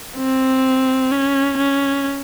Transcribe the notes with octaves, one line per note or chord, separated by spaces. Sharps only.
C4
C#4
C#4